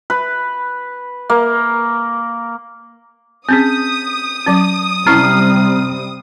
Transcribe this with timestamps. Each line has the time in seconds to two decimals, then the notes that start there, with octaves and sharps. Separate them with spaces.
0.10 B4
1.30 A#3
3.49 C4 C#4 G#4 D#6 G6 B6
4.46 F#3 C#4
5.07 C3 G3 C4 C#4 E4 A#5 F6 C7